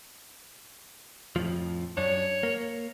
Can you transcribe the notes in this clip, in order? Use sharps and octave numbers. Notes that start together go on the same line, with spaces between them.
F2 A2 F3
F#2 D4 C#5
A#3